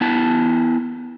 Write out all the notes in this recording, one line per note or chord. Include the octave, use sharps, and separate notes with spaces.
B3 E4 A5